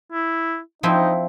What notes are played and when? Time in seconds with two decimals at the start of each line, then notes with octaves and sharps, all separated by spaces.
0.12 E4
0.83 F3 C4 D#4 E4